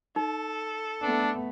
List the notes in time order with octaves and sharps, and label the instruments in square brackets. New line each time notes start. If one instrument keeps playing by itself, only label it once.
[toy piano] D#4 [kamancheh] A4
[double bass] A3 B3 [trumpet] D4